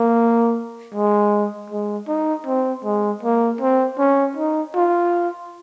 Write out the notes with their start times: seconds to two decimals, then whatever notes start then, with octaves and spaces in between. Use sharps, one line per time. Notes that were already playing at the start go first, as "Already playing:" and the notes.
Already playing: A#3
0.95 G#3
1.71 G#3
2.08 D#4
2.47 C4
2.85 G#3
3.23 A#3
3.61 C4
3.99 C#4
4.37 D#4
4.76 F4